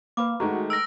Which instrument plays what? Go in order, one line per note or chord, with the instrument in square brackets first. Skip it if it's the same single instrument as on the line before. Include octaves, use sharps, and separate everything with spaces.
[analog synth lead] A#3 [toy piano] B4 B5 D6
[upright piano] D#3 G#3 A3 [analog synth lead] F#4 [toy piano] A#5
[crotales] E6 F6 A#6 [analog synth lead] D7